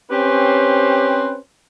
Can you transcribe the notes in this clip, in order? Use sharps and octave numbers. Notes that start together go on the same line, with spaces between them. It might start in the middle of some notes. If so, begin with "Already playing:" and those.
C4 C#4 G4 B4 C5